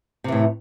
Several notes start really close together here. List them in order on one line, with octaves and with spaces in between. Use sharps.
C3 E3 A2